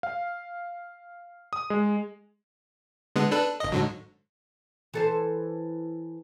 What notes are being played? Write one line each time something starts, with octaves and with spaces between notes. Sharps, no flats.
F5
D#6
G#3
D3 G#3 B3
D4 A4 B4
G1 D#5
G#2 D3 F#3
E3 A4 C5